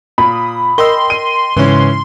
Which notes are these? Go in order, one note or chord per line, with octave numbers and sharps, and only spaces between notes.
A#2 B5 D#6
A#4 D#5 G5 C6 D#6 E6
D#7
G#2 C#3 E3 C#4 C6